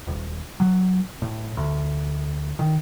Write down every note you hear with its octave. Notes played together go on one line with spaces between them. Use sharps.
D#1
F#3
A2
D2
D#3